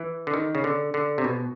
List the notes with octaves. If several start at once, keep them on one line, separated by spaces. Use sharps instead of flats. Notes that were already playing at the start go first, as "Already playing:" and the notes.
Already playing: E3
D3
D#3
C#3
D3
D3
C3
B2